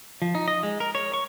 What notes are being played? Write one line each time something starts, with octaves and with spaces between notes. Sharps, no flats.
F3
D#4
D#5
G#3
A#4
C#5
C#6